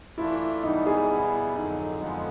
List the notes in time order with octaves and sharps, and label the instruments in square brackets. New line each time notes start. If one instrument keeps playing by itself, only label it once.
[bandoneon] E3 A3 D4 F4 [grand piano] E4
[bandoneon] G#2 E3 G3 B3 [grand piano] D#4
[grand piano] G#4
[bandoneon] B2 G3 B3 E4
[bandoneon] F2 D3 F#3 [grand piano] D#4
[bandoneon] F2 D3 F3 G#3 B3